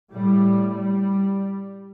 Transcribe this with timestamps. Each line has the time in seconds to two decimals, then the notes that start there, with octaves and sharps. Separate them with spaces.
0.13 A2 G3
0.75 G3